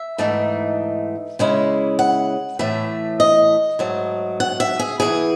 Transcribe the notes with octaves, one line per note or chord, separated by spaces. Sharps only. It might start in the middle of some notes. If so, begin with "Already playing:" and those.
Already playing: E5
G#2 E3 A3 D#4
C#3 G#3 C#4 E4
F#5
A2 E3 A3 E5
D#5
G#2 F#3 A3
F#5
E5
G#4
E2 C#3 E3 G#4